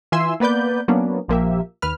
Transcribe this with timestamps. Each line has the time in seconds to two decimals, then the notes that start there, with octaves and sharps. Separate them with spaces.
0.12 E3 F4 E5 G#5 C6 E6
0.40 A#3 B3 B4 D5 G6
0.88 F#3 A#3 B3 C#4 D4
1.28 A#1 F3 A#3 G4 E5
1.82 D#2 B4 F6